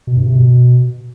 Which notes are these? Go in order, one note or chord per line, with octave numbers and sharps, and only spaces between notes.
B2
G2
C3
B2